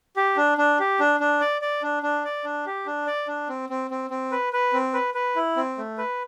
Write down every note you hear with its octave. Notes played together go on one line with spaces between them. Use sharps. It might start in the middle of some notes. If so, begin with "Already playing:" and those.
G4
D4
D4
G4
D4
D4
D5
D5
D4
D4
D5
D4
G4
D4
D5
D4
C4
C4
C4
C4
B4
B4
C4
B4
B4
E4
C4
A3
B4